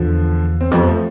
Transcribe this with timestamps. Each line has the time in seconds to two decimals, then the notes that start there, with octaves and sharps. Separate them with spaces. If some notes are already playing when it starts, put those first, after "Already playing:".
Already playing: E2 D3 F3
0.61 C4
0.71 F2 G3 B3
0.87 F3 A3